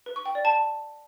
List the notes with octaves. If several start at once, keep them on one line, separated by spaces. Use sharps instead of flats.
B4
C#6
G5
D5
A5